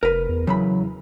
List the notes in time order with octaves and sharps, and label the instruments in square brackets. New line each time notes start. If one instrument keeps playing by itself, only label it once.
[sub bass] F1 [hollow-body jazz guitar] A#4 B4
[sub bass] E2
[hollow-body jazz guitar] C#3 E3 B5 [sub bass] F#3